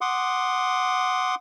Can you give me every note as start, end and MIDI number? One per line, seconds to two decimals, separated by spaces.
0.01 1.35 78
0.01 1.35 84
0.01 1.35 86
0.01 1.35 87